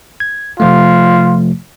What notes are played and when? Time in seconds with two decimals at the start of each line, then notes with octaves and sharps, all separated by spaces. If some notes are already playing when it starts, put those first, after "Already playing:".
0.20 G#6
0.60 C3 F3 A3 F4